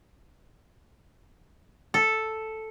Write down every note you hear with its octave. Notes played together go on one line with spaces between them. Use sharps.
A4